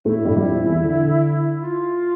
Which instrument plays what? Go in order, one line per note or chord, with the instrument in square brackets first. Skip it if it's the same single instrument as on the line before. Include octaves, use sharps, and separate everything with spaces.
[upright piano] A2 A3 [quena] E4
[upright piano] G2 G3
G3
F2 F3
E2 E3
D3
[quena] F4